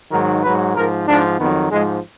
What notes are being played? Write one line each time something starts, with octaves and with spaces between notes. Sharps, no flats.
G#2 D#3 F#3 A#4
G#2 F#3 B4
G#2 F3 A#4
G#2 F3 D4
F2 D#3 F#3 B3
G#2 F3 G#3